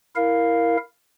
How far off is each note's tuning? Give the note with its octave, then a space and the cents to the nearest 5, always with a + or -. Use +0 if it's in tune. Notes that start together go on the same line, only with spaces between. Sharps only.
E4 +0 A#4 +0 F5 +0